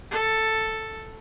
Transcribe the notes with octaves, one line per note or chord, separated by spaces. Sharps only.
A4